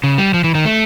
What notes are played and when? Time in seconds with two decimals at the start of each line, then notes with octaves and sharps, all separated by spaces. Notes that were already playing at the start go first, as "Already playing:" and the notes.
0.04 C#3
0.18 G3
0.34 F3
0.44 E3
0.55 D#3
0.65 A3